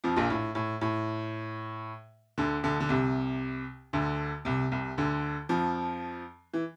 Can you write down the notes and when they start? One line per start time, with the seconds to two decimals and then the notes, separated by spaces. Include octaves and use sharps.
0.04 F2 F3
0.16 A#1 A#2
0.30 A2
0.55 A2
0.81 A2
2.38 D2 D3
2.63 D2 D3
2.80 D3
2.89 C2 C3
3.93 D2 D3
4.45 C2 C3
4.72 C2 C3
4.98 D2 D3
5.49 F2 F3
6.54 E3